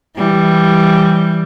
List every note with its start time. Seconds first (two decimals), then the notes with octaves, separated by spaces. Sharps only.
0.17 E3 G3